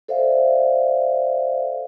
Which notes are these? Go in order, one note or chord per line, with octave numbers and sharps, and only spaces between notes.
A4 C5 D5 E5 F5